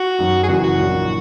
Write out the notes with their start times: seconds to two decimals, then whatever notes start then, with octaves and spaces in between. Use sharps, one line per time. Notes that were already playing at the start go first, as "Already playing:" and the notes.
Already playing: F#4
0.19 F#2 D#3 F#3
0.43 G#4
0.49 F#1 F#2 E3 F#4
0.64 F#4
0.78 A#1 A#2 F#3 A#3 E4